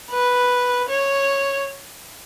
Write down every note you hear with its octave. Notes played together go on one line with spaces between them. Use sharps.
B4
C#5